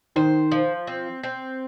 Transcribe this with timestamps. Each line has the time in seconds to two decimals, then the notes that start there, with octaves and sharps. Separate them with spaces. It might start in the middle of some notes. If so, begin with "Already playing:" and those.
0.16 D#3 C5
0.52 F3
0.87 C4
1.23 C4